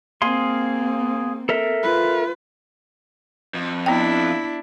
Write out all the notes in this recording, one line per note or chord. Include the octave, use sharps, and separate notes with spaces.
A#3 C4 G#4 F5 C6
A4 A#4 E5
F4 B4
F2
B3 D4 E4 G5